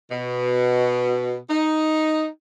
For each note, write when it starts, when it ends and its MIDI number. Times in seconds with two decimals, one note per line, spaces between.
0.11 1.37 47
1.50 2.27 63